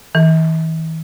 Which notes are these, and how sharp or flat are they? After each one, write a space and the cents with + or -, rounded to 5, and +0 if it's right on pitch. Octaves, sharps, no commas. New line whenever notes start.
E3 -45